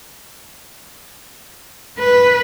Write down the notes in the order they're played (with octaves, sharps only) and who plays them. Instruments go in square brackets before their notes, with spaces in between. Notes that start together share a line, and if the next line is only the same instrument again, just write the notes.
[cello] B4